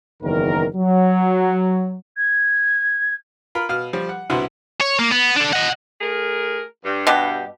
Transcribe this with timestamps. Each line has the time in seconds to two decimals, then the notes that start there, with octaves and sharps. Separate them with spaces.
0.22 F#1 E2 D#3 A#4
0.75 F#3
2.17 G#6
3.55 F4 A#4 B5
3.69 B2 F5 F6
3.93 F3 G3
4.09 F#5
4.30 C2 B2 D3 E4 F#5 C6
4.81 C#5
4.99 A#3
5.12 B3
5.36 D4 A4
5.53 D#5 F#5
6.01 A3 G#4 A#4
6.84 G2
7.07 B2 G4